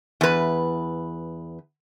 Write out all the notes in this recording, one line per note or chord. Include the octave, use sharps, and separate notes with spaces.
E2 B4